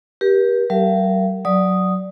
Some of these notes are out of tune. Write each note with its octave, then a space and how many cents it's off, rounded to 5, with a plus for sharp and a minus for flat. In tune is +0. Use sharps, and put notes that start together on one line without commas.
G4 +0 A#4 +45
F#3 +45 A#4 -15 F5 -45
F#3 +0 D5 +0 D#6 +0